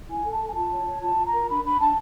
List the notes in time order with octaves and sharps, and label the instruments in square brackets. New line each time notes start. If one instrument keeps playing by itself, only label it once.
[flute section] E4 G#5
A4
A5
A4
G#5
F4 A5
C#5
C#5
F4 A5
F4
A#5
A#4
D4 B5
D4 B5
D4 A5